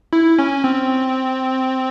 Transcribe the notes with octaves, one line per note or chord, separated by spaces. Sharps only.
E4
C#4
C4